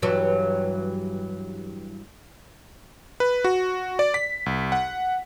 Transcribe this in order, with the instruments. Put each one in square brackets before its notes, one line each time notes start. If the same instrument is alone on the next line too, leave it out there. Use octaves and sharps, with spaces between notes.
[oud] G2 E3 F#3
[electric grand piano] B4
F#4
D5
B6
C2
F#5